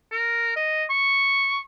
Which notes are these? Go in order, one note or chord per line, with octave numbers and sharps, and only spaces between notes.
A#4
D#5
C#6